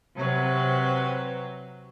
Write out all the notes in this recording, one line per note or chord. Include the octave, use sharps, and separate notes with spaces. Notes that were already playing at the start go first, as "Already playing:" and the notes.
C3 F#3 C4 B4